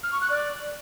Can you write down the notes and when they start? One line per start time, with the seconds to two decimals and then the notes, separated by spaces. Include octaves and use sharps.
0.03 F6
0.12 C#6
0.21 F#6
0.30 D5